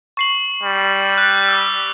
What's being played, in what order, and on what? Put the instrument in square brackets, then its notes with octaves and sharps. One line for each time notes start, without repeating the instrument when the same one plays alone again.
[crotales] C#6 C7 F#7
[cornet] G3
[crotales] F#6
D6 E6